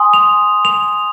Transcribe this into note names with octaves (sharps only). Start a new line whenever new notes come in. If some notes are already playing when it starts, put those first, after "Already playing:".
Already playing: G#5 C6 D#6
F7
F7